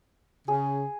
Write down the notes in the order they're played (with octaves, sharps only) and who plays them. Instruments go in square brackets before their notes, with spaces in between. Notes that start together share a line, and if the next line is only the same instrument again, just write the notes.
[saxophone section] C#3 [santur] G#4